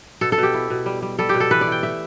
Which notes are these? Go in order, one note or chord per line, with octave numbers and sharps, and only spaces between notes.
B2 A4
A4
B2 G4
E4
B2
G3
G3
G3 A4
G4
B2
A4
E3 B4
D5
E4 G5
A3 E5